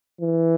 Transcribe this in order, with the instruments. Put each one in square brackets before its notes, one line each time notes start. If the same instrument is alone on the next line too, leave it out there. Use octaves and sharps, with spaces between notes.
[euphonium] E3